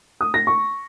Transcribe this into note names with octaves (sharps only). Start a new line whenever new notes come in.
D#6
A#6
C#6